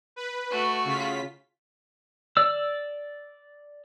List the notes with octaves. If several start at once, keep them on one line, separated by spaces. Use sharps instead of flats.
B4
A3 F#4
C#3 F4 B6
D5 E6